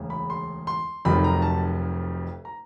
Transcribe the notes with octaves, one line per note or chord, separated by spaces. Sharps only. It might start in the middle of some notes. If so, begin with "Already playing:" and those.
Already playing: E1 D2 C#3
B5
C6
C6
F1 F2 C3 D#3 F#3 B5
A#5
A5
A#5